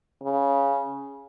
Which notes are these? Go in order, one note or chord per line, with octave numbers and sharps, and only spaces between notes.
C#3